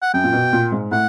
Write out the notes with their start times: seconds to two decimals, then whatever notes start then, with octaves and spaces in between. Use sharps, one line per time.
0.02 F#5
0.14 F#2 G5
0.24 A#2
0.33 B2
0.53 A#2
0.72 G#2
0.92 A2 F#5